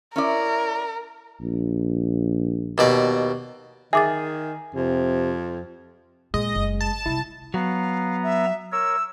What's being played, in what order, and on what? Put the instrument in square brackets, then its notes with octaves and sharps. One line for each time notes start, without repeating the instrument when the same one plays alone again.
[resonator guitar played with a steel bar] C#4 E4 D5 [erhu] A#4
[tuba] A#1
[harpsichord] D#2 B2 D5
[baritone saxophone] D#3 [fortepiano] G#4 [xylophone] E5 D6 A6
[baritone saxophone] F2 [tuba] C3
[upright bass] A#2 [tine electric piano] G#3 [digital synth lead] D#5
[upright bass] F#1
[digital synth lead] A5
[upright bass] C2 [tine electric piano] E4
[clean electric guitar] F#3 [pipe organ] B3 A#5 [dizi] F5
[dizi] E5
[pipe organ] A#4 C#5 [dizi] E6